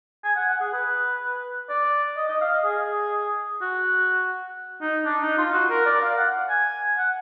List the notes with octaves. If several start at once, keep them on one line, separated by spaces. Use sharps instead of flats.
G#5
F#5
F#5
G#4
B4
D5
D#5
D#5
F5
D#5
G#4
F#4
D#4
D4
D#4
F4
F#4
A#4
D5
F5
F#5
G#5
F#5